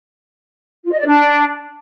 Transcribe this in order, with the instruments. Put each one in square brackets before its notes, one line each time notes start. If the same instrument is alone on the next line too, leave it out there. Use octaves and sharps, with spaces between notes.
[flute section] F4
D#5
D5
D4